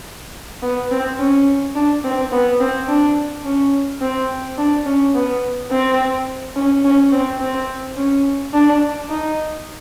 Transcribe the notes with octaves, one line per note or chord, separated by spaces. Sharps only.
B3
C4
C#4
D4
C4
B3
C4
D4
C#4
C4
D4
C#4
B3
C4
C#4
C#4
C4
C4
C#4
D4
D#4